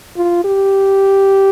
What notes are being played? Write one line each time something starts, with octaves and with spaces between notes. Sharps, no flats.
F4
G4